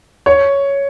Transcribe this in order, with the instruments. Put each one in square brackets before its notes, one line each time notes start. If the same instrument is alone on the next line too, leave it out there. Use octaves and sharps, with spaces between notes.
[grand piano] C#5